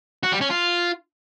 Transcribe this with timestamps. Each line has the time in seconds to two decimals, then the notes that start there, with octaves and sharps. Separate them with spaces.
0.23 F#4
0.32 G3
0.41 C#4
0.50 F4